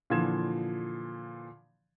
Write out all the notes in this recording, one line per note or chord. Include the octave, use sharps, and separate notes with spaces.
A#2 D3 E3 F3 G#6 E7